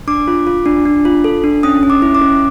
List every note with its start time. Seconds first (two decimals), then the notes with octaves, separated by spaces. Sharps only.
0.08 D4 D6
0.28 F4
0.47 F4
0.66 D4
0.85 D4
1.05 F4
1.24 A4
1.44 D4
1.63 C#4 D#6
1.83 C#4
1.90 D6
2.02 E4
2.15 D6
2.22 C#4